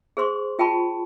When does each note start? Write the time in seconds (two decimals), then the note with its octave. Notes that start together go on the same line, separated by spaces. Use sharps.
0.17 G#4 C5 C6 C#6
0.59 F4 G5 A5 B5 C#6